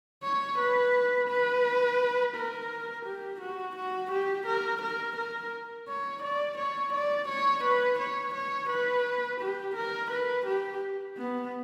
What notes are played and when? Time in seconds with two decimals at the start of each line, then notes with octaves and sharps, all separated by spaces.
0.23 C#5
0.58 B4
1.28 B4
2.35 A#4
3.06 G4
3.41 F#4
3.76 F#4
4.11 G4
4.47 A#4
4.82 A#4
5.17 A#4
5.87 C#5
6.23 D5
6.58 C#5
6.93 D5
7.29 C#5
7.64 B4
7.99 C#5
8.34 C#5
8.70 B4
9.40 G4
9.76 A#4
10.11 B4
10.46 G4
11.17 B3